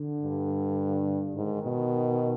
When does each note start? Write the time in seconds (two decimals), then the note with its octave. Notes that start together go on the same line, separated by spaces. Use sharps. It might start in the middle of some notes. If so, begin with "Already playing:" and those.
Already playing: D3
0.21 G2
1.35 G#2 D#3
1.64 B2